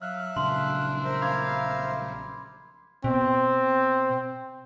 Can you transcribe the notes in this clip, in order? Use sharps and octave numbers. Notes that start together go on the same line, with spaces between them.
F#3 E5 F5 F6 F#6
A#1 C#3 F#3 D4 C6
A#4 C5 E5
F5 B5 D6 G#6
B2 C4